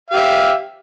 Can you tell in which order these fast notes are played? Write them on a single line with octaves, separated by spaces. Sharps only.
F5 G4 E5